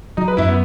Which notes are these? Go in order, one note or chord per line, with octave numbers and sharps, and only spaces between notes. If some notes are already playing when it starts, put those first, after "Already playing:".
F#3 D#4
B4
F#2 E4
B3